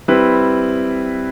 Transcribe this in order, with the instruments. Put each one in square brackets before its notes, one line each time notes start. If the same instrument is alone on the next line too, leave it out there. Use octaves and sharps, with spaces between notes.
[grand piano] G3 C4 E4 B4